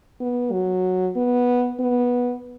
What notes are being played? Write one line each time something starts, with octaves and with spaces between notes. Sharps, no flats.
B3
F#3
B3
B3